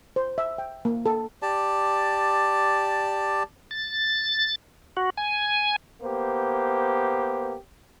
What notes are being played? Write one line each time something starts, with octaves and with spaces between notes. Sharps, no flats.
C5
E5
G5
A#3
A4
G4 D5 A5
A6
F#4
G#5
A#3 B3 G4 C5